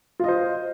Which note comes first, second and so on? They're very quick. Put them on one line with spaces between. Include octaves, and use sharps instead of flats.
F4 D#5 C5